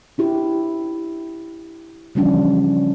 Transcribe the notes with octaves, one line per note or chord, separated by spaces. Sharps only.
D4 E4 G4
C#3 E3 F3 G3 C#4 D4